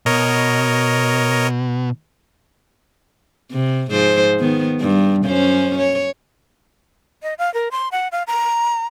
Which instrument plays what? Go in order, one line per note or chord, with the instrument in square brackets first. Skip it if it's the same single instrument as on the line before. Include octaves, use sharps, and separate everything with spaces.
[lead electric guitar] B2 [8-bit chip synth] A#4 C#5 D#5
[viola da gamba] C3
G#2 F3 C5
D#3 B3
G2
F#2 C#4 C5
C#5
[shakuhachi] D#5
F5
A#4
C6
F#5
F5
A#5